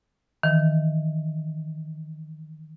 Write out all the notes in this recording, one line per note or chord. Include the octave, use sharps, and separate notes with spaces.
D#3 E3